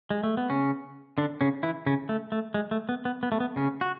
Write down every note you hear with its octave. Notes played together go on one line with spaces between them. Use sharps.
G#3
A3
B3
C#3 C#4
D3 D4
C#3 C#4
E3 E4
C#3 C#4
A3
A3
G#3
A3
B3
B3
B3
A3
B3
C#3 C#4
F#4